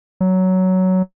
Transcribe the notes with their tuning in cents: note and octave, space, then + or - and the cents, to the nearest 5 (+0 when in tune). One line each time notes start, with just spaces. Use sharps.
F#3 +10